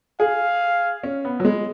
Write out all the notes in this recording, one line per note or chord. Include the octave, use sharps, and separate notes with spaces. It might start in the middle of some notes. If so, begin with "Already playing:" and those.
G#4 F5
C#4
B3
F#3
G#3